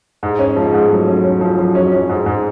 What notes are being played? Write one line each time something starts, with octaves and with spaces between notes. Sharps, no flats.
G#2
C#4
F3 G#3
G#2
F#3 A3
C#4
C#4
F3
F3 F#3
C#4
C#4
G#2
G#2